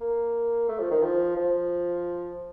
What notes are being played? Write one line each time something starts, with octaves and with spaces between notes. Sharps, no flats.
A#3
A3
F3
D#3
F3
F3